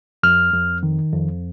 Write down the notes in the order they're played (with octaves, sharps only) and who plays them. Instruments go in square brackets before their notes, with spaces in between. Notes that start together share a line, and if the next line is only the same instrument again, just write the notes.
[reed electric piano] F2 F6
F2
D#3
F2